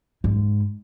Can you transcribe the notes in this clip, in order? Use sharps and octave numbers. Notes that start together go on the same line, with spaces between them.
G#2